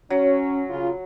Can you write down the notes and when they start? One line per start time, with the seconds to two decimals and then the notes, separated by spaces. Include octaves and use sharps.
0.10 F#3 C#4
0.68 C#3 F4